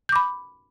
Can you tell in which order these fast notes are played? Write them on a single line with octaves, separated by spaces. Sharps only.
G6 D6 B5